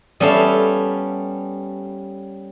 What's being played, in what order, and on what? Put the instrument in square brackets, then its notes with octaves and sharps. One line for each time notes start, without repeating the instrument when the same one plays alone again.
[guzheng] G3 B3 C#4 A4 E5 F5